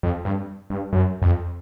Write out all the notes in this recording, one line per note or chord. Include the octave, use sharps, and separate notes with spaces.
F2
G2
G2
F#2
F2